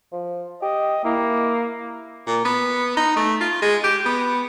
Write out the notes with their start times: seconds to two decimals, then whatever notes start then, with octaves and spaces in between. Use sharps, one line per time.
0.13 F3
0.62 G4 D#5
1.04 A#3 E4
2.27 A#2
2.45 B3
2.97 D#4
3.16 A3
3.41 F4
3.62 G#3
3.84 G4
4.06 B3